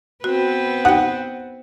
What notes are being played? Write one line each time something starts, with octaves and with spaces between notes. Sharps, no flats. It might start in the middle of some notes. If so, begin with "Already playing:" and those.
B3 C4 F#4 B4
D#4 F#5 G5